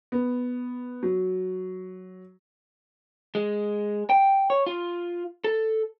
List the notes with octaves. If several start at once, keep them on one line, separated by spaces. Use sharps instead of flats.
B3
F#3
G#3
G5
C#5
F4
A4